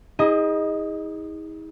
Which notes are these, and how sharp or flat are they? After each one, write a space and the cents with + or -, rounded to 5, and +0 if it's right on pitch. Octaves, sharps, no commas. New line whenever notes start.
D#4 +45 G#4 -25 D#5 +0